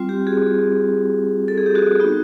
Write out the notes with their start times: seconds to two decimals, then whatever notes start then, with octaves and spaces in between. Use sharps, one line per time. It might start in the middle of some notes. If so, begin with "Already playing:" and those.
Already playing: G3 C4 F4
0.09 G4
0.27 F#4 G#4
1.48 A4
1.57 G#4
1.66 G4
1.75 F#4 G#4
2.00 B3 D#4 F#4